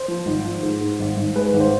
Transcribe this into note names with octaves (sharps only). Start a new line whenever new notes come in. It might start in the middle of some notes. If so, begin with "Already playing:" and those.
Already playing: C5
F3
G#1
F3
G#2
G#2
G#1
G#1
G#3 B4
G#1
C5